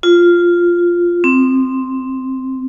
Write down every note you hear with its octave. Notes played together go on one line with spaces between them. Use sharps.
F4
C4